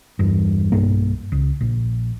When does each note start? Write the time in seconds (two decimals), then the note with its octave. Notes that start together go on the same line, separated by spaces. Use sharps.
0.19 E2 G2
0.72 B1 G2 A#3
1.32 C#2
1.61 A#1